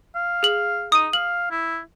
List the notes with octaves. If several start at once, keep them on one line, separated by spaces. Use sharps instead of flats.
F5
G#4 F#7
D#4 D#6 D#7
F5 F#7
E4